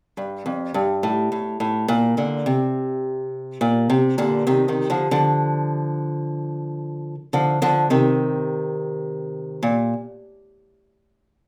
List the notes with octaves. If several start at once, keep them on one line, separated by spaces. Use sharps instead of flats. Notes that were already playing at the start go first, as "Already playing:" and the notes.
G2
F2
G2
A2
A2
A2
A#2
A#2 D3
C3
A#2
C3
A#2 D3
C3 D#3
C3 D#3
D3 F3
D3 F3
D3 F3
D3 F3
C3 D#3
A#2